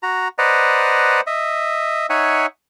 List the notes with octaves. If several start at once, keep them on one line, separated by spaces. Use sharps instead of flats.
F#4 A#5
B4 C5 D5 D#5 F#5 A#5
D#5 E5
D#4 C#5 E5 F#5 G#5